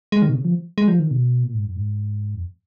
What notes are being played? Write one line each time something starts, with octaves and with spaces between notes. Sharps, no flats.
G#3
D#3
B2
C#3
F3
G#3
F3
D#3
B2
A#2
G#2
F#2
G#2
F2